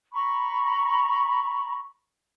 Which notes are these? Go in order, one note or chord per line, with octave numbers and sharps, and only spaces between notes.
A#5 B5 C#6